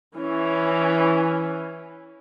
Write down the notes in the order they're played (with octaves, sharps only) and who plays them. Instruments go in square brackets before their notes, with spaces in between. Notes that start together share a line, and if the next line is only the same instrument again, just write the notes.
[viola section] E3 C#4